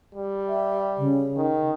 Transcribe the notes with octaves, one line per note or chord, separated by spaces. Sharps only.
G3
E5
C#3
D#3